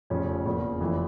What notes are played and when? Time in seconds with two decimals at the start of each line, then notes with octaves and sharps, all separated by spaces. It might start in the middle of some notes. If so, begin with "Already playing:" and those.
0.10 F1 F2 C#3 F3 C#4
0.45 E2 C#3 F3 A#3
0.80 F1 F2 E3